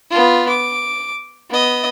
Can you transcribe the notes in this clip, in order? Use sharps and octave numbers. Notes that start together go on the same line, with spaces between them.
B3 F4
D6
B3 D#5